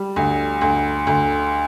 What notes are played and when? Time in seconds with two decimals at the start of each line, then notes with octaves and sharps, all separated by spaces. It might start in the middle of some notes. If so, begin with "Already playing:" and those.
Already playing: G3
0.16 D2
0.61 D2
1.07 D2